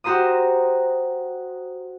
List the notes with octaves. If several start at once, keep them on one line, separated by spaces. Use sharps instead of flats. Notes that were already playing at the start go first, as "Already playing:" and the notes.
F#4 G4 C5 A#5 D#6